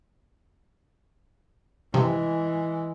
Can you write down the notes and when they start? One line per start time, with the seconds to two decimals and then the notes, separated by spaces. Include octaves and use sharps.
1.94 G2 C3 E3 F3 G#3